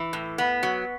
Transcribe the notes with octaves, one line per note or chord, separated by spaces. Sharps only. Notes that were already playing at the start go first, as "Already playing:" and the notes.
Already playing: E3
A2
B3
F#3